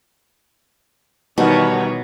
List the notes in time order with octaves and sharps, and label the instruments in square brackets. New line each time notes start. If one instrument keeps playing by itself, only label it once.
[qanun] B2 [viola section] D#3 E3 C#5 [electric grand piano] G3 D#4 F#5